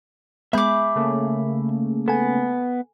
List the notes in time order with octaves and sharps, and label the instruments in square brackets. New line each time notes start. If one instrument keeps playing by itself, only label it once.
[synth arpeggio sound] G#3 B3 [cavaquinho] G#4 D6 [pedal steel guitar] E5 B5 G6
[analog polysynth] C#3 A3 A#3
[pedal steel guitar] B3 [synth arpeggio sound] A4 G#5